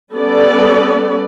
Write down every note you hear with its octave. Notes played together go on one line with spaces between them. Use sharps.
G3 B3 C#4 A4 D5